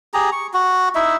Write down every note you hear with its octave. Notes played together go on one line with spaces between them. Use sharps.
G4 G#4 A#5
C#6
F#4
D#4 E4 E5